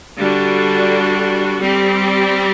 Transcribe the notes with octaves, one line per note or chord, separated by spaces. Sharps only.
D3 G3 D4 F#4
G3 C4 G4